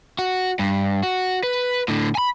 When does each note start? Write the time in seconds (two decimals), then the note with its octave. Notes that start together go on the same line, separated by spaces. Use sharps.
0.19 F#4
0.59 G2
1.03 F#4
1.43 B4
1.88 A2 D3
2.15 G#5 B5